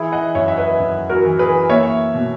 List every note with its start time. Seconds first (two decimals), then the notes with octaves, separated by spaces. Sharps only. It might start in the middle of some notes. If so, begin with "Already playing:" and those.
Already playing: E3 E4 G#4
0.12 D#5 F#5
0.35 F#2 C#5 E5
0.48 E5
0.57 B4 D#5
0.80 F#2
1.10 F#4 A#4
1.25 E3
1.39 G#4 B4
1.70 A#3 C#5 E5
2.15 B2